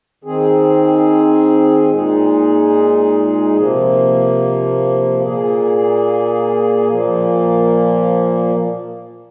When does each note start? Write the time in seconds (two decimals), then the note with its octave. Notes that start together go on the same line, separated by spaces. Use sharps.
0.24 D#3 C4 G#4
1.90 A#2 G#3 D#4 G#4
3.56 C3 F3 A#3
5.23 A#2 A#3 G#4
6.89 A#2 F3 A#3